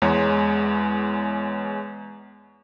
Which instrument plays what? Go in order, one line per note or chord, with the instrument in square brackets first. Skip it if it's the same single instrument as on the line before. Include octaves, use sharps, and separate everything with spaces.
[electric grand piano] E2 G#3 C#5